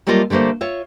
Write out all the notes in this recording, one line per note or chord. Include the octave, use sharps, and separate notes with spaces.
F#3 G3 A3 A#3 F4 D#5
D3 G3 A3 A#3 C5
F4 C#5 E5